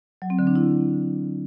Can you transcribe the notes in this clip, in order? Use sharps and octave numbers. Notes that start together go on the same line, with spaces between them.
F#3
C4
D3
D4
E4